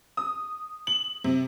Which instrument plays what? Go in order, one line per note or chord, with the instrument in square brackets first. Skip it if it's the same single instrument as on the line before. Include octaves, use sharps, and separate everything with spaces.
[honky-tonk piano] D#6
F#7
C3